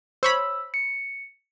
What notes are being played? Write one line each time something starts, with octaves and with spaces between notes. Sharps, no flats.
C5 C#5 B5 E6
C#7